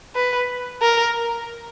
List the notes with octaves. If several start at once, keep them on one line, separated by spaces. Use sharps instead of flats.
B4
A#4